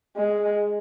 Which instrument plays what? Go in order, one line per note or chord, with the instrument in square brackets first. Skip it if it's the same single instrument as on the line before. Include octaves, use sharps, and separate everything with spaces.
[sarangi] G#3